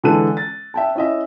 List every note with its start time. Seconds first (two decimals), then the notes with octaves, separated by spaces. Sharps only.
0.03 D3 E3 G#3 A4 F#6 D#7
0.37 A6
0.74 E5 G5 A5
0.95 C#4 E4 D#5 E5